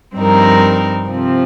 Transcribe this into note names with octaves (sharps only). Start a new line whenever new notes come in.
G2 F3 C4 D#4 A#4
C3 F3 C4